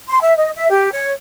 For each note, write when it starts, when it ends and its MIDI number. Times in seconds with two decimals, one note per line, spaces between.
0.07 0.18 84
0.20 0.35 76
0.36 0.50 75
0.55 0.67 76
0.70 0.91 67
0.91 1.11 73